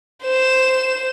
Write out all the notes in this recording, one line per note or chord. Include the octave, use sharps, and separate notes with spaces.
C5 E7